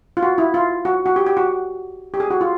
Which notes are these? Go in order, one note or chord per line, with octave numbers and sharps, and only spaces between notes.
F4
F#4
E4
F4
F#4
F#4
G4
G4
F#4
G4
G#4
F#4
F4